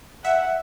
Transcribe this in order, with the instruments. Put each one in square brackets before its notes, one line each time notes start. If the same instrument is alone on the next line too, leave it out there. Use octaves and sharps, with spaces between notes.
[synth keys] E5 [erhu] F#5